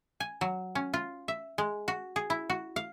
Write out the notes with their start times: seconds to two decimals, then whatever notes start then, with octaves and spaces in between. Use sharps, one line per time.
0.20 G#5
0.41 F#3
0.75 C#4
0.94 F4
1.28 E5
1.58 G#3
1.88 F#4
2.16 G#4
2.30 E4
2.50 F#4
2.76 F5